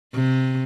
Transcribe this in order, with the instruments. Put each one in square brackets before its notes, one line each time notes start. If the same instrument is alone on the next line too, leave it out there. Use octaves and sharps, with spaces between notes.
[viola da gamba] C3